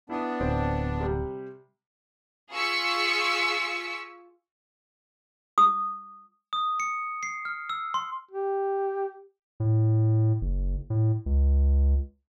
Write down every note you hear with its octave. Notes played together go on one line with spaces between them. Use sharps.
B3 D4 E4 D#6
D1 C4
C3 G3
F4 G#4 C#6 E6 B6 C#7
D#6
D#6
C#7
C7
F6
E6
C6
G4
A2
F#1
A2
C#2